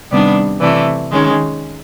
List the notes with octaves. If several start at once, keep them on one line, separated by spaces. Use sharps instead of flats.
C3 D#3 G3 B3 D4 D5
C3 E3 A3 D5
D#3 G#3 C#4